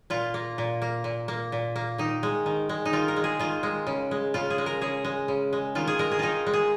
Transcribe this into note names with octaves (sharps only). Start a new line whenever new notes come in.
A#2 F4
A#3
A#2
A#3
A#2
A#3
A#2
A#3
D#3 D#4
G#3
D#3
G#3
D#4
D#3 F4
A#4
G#3
G#4
D#3 F4
G#3
C#3
G#3
C#3 F4
G#4
G#3
A#4
C#3 G#4
G#3
C#3
G#3
D#3 F4
G#4
G#3 A#4
G#4
D#3 D#4 F4
G#3
G#4